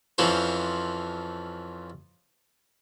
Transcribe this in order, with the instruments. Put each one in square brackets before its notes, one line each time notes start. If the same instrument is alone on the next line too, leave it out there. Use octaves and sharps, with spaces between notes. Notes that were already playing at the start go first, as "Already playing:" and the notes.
[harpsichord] F2 E3 F3 C#4 C5